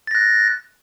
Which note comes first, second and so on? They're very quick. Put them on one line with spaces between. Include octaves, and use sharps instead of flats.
A6 A#6 F#6